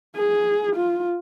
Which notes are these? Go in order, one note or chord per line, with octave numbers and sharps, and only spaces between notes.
G#4
F4